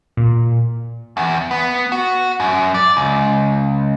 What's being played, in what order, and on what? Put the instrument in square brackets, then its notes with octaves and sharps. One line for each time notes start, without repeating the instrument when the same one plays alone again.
[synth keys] A#2
[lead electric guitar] E2
B3
F#4
F#2
D5
C#2